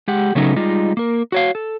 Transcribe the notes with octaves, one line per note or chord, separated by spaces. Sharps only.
G#3 G4 F#5
C#3 F#3 A3 B3 C#4 D#4
G3 G#3 D#4 F4
A#3 A#4
F#4 C#5 F5
A4